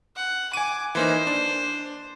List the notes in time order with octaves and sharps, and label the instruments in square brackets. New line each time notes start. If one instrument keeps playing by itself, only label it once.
[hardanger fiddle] F#5
[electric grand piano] G#5 D#7 [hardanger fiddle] D6
[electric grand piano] E3 A#3 D#4 [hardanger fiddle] C5
[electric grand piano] D4